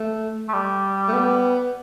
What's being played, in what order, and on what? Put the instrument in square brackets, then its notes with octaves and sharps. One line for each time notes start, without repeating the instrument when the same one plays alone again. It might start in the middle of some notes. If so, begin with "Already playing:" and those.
Already playing: [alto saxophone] A3
[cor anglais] A3
G3
[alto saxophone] A3
B3